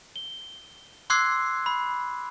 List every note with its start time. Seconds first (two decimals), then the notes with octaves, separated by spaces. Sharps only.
0.16 G7
1.10 C6 D6 E6 F#6 G#6 C7
1.66 B5